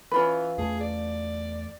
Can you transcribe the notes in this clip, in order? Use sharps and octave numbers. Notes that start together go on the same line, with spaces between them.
E3 C#4 F4 B4
E2 A3 G#4
D5